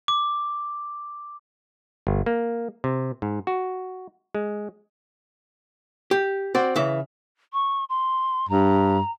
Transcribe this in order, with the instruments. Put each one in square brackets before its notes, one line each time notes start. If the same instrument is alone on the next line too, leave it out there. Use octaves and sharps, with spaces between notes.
[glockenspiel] D6
[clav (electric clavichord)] G1
A#3
C3
G#2
F#4
G#3
[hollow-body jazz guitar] G4
C4 F#4 D5
C#3 E3 E5
[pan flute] C#6
C6
[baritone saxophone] G2 [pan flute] A#5